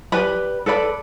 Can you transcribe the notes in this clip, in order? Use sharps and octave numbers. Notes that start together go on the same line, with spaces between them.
G4 B4 D5 B5
A4 B4 D5 B5